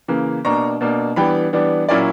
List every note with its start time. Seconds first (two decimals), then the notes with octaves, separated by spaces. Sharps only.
0.08 C#3 E3 A#3
0.45 B2 A#3 D4 A#5 C#6
0.81 B2 A#3 D4
1.16 E3 G3 B3 D4 G5 B5
1.53 E3 G3 B3 D4
1.89 A#2 F#3 A#3 C#4 E4 D5